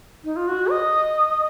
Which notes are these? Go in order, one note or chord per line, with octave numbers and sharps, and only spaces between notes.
D#4
F4
F#4
D#5